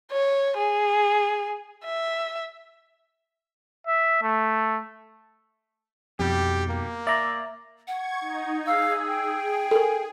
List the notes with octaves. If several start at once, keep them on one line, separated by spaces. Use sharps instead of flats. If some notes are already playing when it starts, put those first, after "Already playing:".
C#5
G#4
E5
E5
A3
B1 F2 G3 G4
A#3
D5 E5 A#5
F#5 C#6 G#6
D#4
G#4 F5 E6
G5
A4 A#4 G#5